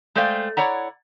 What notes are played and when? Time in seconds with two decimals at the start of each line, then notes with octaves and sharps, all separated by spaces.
0.15 G#3 A3 C5 D5 F5 G5
0.57 E4 C#5 D5 F#5 A#5